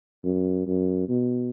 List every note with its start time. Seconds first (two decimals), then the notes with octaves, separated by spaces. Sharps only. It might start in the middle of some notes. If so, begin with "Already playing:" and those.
0.24 F#2
0.67 F#2
1.09 B2